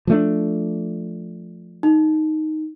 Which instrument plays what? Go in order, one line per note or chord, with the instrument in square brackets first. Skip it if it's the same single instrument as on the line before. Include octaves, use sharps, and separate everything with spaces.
[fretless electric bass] F3 A3 D4
[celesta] D#4